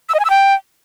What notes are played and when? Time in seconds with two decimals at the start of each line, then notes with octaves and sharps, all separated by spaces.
0.09 E6
0.14 D#5
0.20 G#5
0.25 E6
0.30 G5